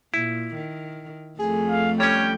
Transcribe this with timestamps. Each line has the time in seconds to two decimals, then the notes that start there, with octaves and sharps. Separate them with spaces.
0.14 A#2 E4
0.55 D#3
1.39 F2 A3 G#4
1.69 F5
2.00 G3 C#4 C#5 G5